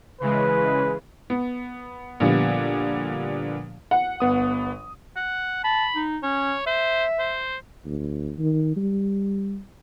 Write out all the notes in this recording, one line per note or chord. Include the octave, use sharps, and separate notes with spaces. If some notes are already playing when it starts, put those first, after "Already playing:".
C#3 E3 G#3 B4
B3
A#2 D3 F3 G3 B3
F#5
G1 B3 D#6
F#5
A5 B5
D#4
C#4 C#5
C5 E5
C5
D2
D#3
G3